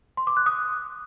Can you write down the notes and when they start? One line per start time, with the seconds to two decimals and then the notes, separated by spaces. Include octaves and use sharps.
0.17 C6
0.27 D6
0.37 F#6
0.46 D#6